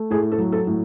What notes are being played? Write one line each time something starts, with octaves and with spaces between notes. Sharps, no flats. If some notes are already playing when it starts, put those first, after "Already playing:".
Already playing: A3
A2 G#4
A4
F#3
A4
A2